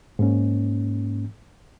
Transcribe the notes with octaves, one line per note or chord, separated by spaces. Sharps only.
G#2 A#3 C#4